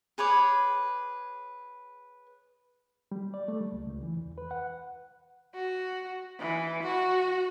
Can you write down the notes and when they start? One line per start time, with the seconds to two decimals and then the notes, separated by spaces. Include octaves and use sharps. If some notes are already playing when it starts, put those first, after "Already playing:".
0.18 G#4 B4 C#5 D6
3.12 G3
3.34 D5
3.48 A3
3.60 G3
3.72 C#2
3.87 C#2
4.03 E3
4.17 E2
4.38 B4
4.51 F#5
5.55 F#4
6.40 E3
6.83 F#4